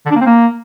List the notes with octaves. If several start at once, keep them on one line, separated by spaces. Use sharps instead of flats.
D3
D4
A#3
C4
A#3